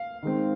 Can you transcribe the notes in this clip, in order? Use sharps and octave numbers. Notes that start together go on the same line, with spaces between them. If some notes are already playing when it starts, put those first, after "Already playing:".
Already playing: F5
D#3 G#3 C4